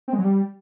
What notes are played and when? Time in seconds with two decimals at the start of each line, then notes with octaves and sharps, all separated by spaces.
0.08 C4
0.13 G#3
0.18 F#3
0.24 G3